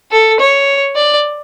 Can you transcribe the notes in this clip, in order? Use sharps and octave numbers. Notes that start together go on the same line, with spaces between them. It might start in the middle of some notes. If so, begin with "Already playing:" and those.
A4
C#5
D5